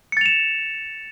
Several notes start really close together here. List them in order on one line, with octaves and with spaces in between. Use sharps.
C#7 A6 F7 E7